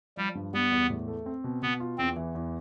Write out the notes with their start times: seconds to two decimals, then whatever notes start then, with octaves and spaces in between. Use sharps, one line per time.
0.17 F3 G3
0.35 G2
0.53 G3 B3
0.71 E2
0.90 A2
1.08 A3
1.26 C4
1.44 B2
1.62 B2 B3
1.80 F4
1.98 E2 C4
2.16 E3
2.35 E2